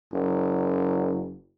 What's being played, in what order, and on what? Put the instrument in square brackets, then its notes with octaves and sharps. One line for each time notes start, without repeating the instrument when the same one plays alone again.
[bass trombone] F#1